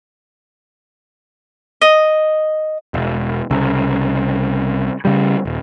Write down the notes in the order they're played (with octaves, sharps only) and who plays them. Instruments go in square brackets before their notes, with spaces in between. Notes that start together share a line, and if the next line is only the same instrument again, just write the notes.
[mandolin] D#5
[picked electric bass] E1
C2 C#3
C#3 G3
D#1